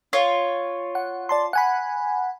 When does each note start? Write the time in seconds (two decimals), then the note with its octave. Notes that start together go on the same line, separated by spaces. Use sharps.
0.13 F4 C#5
0.95 F#5
1.29 D5 A5 C6
1.53 F#5 G#5 B5